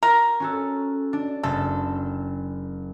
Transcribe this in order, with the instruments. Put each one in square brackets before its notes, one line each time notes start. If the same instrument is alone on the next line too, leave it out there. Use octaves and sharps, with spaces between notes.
[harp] F4 [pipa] A#4
[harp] C#4 F#4 A4
D4
[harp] F#1 [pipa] A4